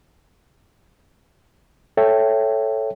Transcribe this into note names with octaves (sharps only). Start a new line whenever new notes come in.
A4 C#5 E5 G5